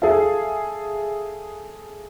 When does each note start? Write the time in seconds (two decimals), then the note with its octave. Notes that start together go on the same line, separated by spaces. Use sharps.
0.02 G#4 A4 E5 F5